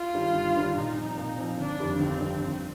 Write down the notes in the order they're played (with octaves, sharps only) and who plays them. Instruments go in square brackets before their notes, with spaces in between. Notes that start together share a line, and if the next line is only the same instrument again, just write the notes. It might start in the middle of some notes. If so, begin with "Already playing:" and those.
Already playing: [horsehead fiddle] F4
[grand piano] G2 D#3 G3 D4
G1
G2 D#3 G3 D4
[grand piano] A#2 [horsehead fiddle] D#4
[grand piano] F3 C4
A#2
F3 C4
[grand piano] G1 [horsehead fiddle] D4
[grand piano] F2 D#3 G3
[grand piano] G1 [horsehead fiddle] C4
[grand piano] F2 D#3 G3
F2